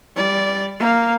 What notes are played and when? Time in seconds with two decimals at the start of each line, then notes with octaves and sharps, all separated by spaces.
0.15 G3 D5
0.80 A#3 F5